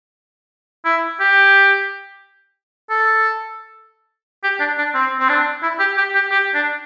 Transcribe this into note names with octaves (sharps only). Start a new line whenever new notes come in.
E4
G4
A4
G4
D4
D4
C4
C4
D4
E4
G4
G4
G4
G4
D4